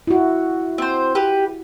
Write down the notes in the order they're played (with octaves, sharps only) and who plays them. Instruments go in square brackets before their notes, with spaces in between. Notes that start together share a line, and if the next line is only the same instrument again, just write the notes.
[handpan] E4 F#4
[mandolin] C4 C5
G4 B4